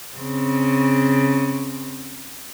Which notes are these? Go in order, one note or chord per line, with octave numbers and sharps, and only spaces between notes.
C#3 C4